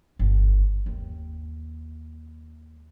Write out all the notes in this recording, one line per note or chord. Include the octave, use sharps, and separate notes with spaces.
G1
D#2